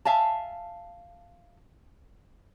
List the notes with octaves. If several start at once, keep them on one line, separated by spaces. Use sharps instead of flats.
E5 F5 G#5 A5